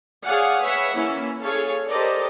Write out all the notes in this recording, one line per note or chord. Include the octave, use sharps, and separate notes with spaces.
G#4 C#5 D5 F5 F#5 G#5
B4 C#5 E5 F#5
E3 A#3 C#4 E4
G#4 A4 C#5 F5
G4 A4 A#4 C5 D5 D#5